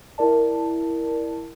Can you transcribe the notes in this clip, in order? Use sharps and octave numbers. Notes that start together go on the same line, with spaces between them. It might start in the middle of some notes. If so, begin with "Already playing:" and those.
E4 A#4 D5 A5